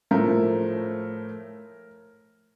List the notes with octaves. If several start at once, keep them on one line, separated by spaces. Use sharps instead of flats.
A2 F3 A3 A#4